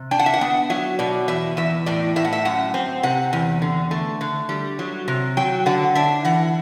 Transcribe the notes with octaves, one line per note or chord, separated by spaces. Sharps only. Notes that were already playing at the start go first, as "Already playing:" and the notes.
Already playing: C3
D4 G5
F#5
E5
F#5
B3
F#3 E5
B2 D5
E2 E5
E2 E5
A2 D5
A2 E5
F#5
E5
F#2 F#5
C4
C3 F#5
E2
D3
A3
D3
G3
F#3
C3
F#3 G5
D3 F#5
D4 E5
E3 F#5